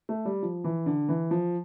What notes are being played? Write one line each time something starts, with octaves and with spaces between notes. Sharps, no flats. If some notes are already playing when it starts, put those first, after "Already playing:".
A3
G3
F3
E3
D3
E3
F3